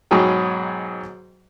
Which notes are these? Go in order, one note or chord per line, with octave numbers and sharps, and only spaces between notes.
G#2 B2 F#3 G#4 G5